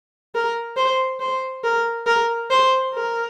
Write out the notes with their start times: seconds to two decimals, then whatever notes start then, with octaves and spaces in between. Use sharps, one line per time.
0.35 A#4
0.77 C5
1.20 C5
1.64 A#4
2.06 A#4
2.50 C5
2.94 A#4